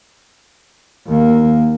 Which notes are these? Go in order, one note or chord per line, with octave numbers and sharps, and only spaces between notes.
D#2 A#3